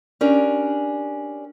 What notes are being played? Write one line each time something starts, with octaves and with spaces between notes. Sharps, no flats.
C#4 D4 G4 A#4